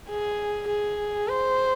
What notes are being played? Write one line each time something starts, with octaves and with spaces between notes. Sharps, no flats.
G#4
G#4
C5